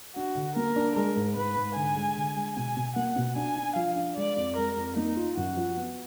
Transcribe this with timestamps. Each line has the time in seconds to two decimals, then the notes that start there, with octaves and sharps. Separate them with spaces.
0.15 D4 F#4
0.35 D3
0.56 A#3 A#4
0.76 D4
0.95 G#3 A#4
1.15 G#2
1.35 G#2 B4
1.56 G#2
1.75 D3 G#5
1.96 G#3
2.16 D3
2.36 G#3
2.56 B2 G#5
2.76 B2
2.96 A#3 F#5
3.16 B2
3.36 D4 G#5
3.56 D4
3.76 F3 F5
3.96 D4
4.16 G#3 D5
4.36 F2
4.56 G#3 A#4
4.77 F2
4.96 A#3 D#4
5.16 F4
5.37 F#2 F#4
5.57 F3
5.77 B3